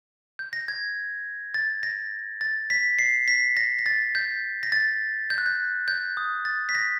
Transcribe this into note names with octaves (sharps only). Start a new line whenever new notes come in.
G6
A#6
G#6
A6
A#6
A6
B6
C7
B6
A#6
A#6
A6
G6
A#6
A6
G6
F#6
G6
G6
D#6
A6
B6
A#6